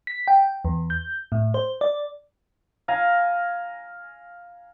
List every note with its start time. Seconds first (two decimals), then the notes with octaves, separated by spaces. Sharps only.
0.07 B6
0.28 G5
0.65 E2
0.90 G6
1.32 A2
1.54 C5
1.81 D5
2.88 F5 G#5 A#5